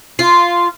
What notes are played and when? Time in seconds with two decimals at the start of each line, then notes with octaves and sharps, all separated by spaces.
0.19 F4